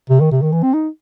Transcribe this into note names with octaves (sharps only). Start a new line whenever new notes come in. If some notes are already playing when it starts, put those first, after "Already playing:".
C3
D#3
C3
D#3
E3
C4
D#4